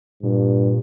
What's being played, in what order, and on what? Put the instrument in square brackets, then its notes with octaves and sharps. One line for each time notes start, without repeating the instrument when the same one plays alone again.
[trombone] G2 [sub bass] A#2